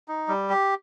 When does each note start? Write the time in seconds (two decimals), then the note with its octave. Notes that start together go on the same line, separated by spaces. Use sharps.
0.08 D#4
0.28 G3
0.50 G4